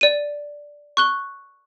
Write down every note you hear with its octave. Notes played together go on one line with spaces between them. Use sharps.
D5 D#7
C#6 F#6 G7